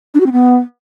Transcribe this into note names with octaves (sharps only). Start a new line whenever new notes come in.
D4
F#4
C4
B3